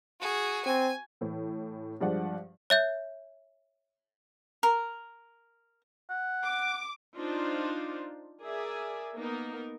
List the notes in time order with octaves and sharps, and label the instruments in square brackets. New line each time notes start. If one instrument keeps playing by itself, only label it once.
[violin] F#4 G#4
[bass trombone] C4 [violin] G#5
[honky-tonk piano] A2 E3
G2 F3 G#3 D5 F#5
[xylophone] C#5 E5 G6
[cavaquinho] A#4
[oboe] F#5
[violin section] D6
[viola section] D4 D#4 F4 C5
G#4 A#4 D5 E5 G#5
A#3 B3 D#4 A#4